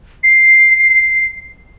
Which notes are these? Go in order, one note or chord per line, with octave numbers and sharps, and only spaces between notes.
C7